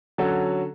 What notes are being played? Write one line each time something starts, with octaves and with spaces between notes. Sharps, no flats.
D3 F#3 C#4 F#4 A4